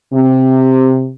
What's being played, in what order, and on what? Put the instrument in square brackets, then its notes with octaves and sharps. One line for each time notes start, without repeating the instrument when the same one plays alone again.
[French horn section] C3